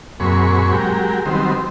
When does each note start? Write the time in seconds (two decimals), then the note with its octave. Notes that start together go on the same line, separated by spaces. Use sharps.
0.20 F#2 A#2 C4 G#4 B5 C#6
0.72 F#3 G#3 G4 A#4
1.26 D#3 F#3 G3 B3 C4 C5